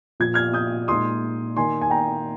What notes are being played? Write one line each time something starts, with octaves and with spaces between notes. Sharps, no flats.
A#2 F3 A#3 F4 G#6
F6 G#6
D#6 G6
A#2 G#3 D#4 C6 D#6
D#3 A#3 D#4 G#5 C6
G#5
G5 A#5